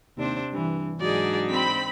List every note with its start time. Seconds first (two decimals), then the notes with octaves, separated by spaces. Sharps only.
0.18 D#2 C3 D4 C5
0.53 G2 E3
1.01 G#2 F#3 D4 D#4 G#4 D5
1.50 C4 B5 B6